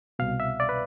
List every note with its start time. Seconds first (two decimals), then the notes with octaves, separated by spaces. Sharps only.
0.19 C2 B2 F5
0.40 E5
0.60 D5
0.69 B4